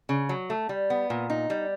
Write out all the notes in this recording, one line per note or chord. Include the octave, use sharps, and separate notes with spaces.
C#3
F#3
A3
G3
B3
A#2
D#4
G3